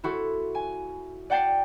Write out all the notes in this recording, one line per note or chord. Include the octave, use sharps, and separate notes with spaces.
E4 F#4 A4 C5
G#5
D5 F#5 G5 A5 A6 C7